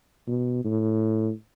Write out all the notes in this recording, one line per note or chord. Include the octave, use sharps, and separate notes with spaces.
B2
A2